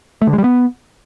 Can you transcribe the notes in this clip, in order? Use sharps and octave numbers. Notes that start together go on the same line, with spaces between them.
A3
D3
G#3
G3
B3